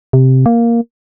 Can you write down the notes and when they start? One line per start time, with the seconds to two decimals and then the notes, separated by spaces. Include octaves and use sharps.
0.13 C3
0.46 A#3